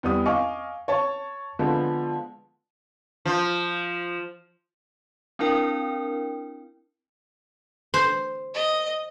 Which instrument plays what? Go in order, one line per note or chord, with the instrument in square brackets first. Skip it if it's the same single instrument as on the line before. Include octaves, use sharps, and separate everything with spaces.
[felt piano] E2 G3 D#6
D#5 F5 G#5 C#6 D6
C#5 A5 C#6
D3 F3 G#3 B3
[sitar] F3
[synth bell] C4 D4 E4 A#4 G5
[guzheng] C5
[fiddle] D#5